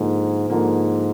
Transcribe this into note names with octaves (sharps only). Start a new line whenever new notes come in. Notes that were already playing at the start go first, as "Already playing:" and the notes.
Already playing: G#2 D3 F3 A#3
G#2 D3 F3 A#3